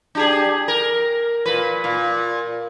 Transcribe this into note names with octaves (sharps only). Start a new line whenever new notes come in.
D4 G4 G#4
A#4
A#2 B4
A#2